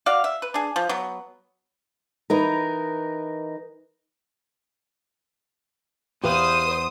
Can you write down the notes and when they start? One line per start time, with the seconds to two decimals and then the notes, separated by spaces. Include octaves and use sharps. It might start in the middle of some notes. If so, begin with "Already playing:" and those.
0.06 F#4 D5 F5
0.24 E5
0.42 B4
0.54 D4 G#4
0.76 F3
0.89 F#3 B3
2.30 E3 D#4 A#4
6.24 E2 G4 B4 C5 F5 D#6